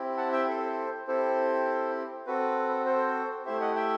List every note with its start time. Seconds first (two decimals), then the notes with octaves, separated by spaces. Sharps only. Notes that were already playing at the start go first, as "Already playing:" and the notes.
Already playing: C4 E4 G4
0.17 F#5 A5
0.32 E5 G5
0.48 A4 C5
1.07 C4 E4 G4 A4 C5
2.26 C4 F#4 A4 B4
2.86 A4 C5
3.45 A3 E4 G4 C5 E5
3.61 D#5 F#5
3.76 E5 G5